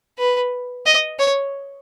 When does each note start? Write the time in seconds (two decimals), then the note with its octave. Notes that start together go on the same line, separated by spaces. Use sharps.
0.18 B4
0.86 D#5
1.19 C#5